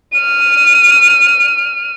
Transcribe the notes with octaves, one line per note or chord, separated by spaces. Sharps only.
F6 D#7